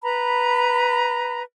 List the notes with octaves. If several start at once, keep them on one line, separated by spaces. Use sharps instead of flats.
B4 A#5 B5